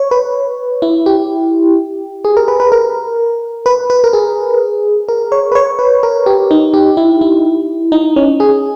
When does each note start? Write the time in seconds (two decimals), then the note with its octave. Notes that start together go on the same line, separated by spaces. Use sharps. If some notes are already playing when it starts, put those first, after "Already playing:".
Already playing: C#5
0.11 B4
0.82 E4
1.06 G4
2.25 G#4
2.37 A#4
2.48 B4
2.60 B4
2.72 A#4
3.66 B4
3.90 B4
4.04 A#4
4.13 G#4
5.08 A#4
5.32 C#5
5.52 B4
5.55 C#5
5.79 B4
6.03 A#4
6.26 G4
6.51 D#4
6.74 G4
6.97 E4
7.21 E4
7.92 D#4
8.16 C#4
8.40 G#4